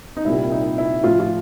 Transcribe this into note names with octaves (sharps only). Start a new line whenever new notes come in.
D#4
C2 A#2 G3 E4
D#4
E4
A2 F3 F4
F4